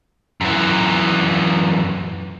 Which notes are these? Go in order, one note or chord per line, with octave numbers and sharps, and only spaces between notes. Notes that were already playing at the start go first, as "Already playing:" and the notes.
F#2 E3